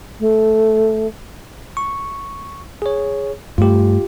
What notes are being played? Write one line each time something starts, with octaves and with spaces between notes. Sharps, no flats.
A3
C#6
G#4 C#5
G2 A3 F4 G4